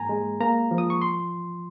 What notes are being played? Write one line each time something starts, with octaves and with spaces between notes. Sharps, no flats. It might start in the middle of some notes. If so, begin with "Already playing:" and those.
Already playing: G#2 A#3 G#5 A#5
G#3
A#3 A#5
F3
D#6
C#6
C6